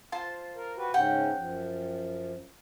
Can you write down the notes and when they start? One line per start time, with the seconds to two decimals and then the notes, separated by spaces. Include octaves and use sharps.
0.12 F4 C5 A5
0.55 A#4
0.77 F#4 G4 B4
0.94 G#2 C#3 C#4 F#5 G5
1.37 F#2 F3